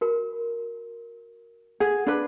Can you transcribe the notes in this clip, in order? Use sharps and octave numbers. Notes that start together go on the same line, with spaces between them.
F#4 A#4
G#4 F#5
D4 B4